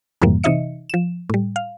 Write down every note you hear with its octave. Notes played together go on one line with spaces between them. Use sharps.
F2 G#2 C3 E3 G3 A#3
C3 E3 D#4 D#5 E5 C#7
F3 E7
A2 G3
F5